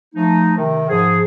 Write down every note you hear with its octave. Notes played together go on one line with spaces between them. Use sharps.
F3 A3 D#4
C3 D#3
G#2 F3 G#4